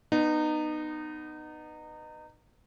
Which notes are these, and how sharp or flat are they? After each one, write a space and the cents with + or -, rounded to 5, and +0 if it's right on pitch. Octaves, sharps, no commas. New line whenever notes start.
B3 +0 D#4 -25